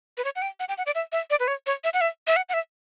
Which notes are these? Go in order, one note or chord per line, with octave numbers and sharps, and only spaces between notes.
B4
C#5
F#5
G5
F#5
G5
F#5
D5
E5
E5
D5
B4
C#5
C#5
E5
F#5
E5
E5
F#5
F#5
E5